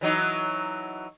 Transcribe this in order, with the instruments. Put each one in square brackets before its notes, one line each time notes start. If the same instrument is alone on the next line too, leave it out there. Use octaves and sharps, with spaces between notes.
[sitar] E3 F#3 D#4